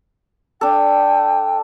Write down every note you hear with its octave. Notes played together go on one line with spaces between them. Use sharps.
D4 A4 G5